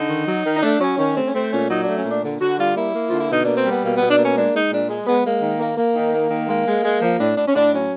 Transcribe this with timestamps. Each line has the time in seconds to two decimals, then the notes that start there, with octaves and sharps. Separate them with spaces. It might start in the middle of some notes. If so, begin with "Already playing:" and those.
Already playing: D3 D#4
0.09 D#3
0.27 F#3
0.45 D#3
0.56 D#4
0.62 A3 D4
0.80 F#3 C#4
0.98 D#3 C#4
1.16 A3 C4
1.25 C#4
1.34 A3 C4
1.51 A#2 C#4
1.69 F#3 D#4
1.82 A3 D4
1.96 C#4
2.05 A#2 D4
2.22 D3
2.40 D3 F#4
2.58 G3 F4
2.76 A#3 E4
2.94 A#3
3.09 D3 F4
3.19 E4
3.29 B2 D#4
3.42 A#3 D4
3.55 C4
3.65 G3 B3
3.82 B2 A#3
3.95 B2 B3
4.09 D4
4.18 A#3 C#4
4.35 G#3 D4
4.53 G#3 D#4
4.71 A#2 D4
4.88 G#3
5.06 G#3 B3
5.24 G#3 A#3
5.42 D#3
5.60 A#3
5.77 A#3
5.95 D#3
6.13 A#3
6.30 D#3
6.48 G#3 A#3
6.66 G#3
6.84 G#3
7.01 F3 A#3
7.20 A2 D4
7.37 A2 D4
7.47 C#4
7.55 A2 D4
7.73 F#3 C#4